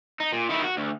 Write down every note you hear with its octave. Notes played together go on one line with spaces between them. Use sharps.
D#4
A#2
D#3 E4
F#4
D2